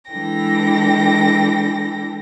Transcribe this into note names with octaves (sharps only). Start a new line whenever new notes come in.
E3 G#3 D4 A4 G5 A#6